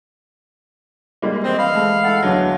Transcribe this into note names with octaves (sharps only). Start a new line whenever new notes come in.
G3 G#3 A#3
E3 C4 D#5
F5 B5
G#3 A3
E4 A4 F#5
E2 D3 F#3